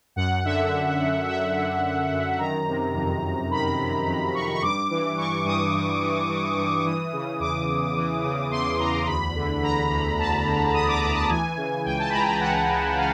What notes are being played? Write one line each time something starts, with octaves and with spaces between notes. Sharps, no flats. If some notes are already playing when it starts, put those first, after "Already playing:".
F#2 F#5
D3 E5
D3
F#2
F#2 E5
D3
D3
F#2
D#3 A#5
C3
F2
F2
D#3 B5
C3
F2
F2 C#6
C#6
G2 D6
E3
E3 C#6
G2 D#6
G2
E3
E3
G2
E3 D#6
C#3
E2 D6
E2
E3
C#3
E2 C6
E2 A#5
D2 B5
D3
D3 A#5
D2
D2 A5
D3
D3 D#6
D6
D2 A#5
A5
E3 G#5
C#3
C#2 G5
A5
B5
C#2 A#5
A#5
E3 F#5
C#3
F5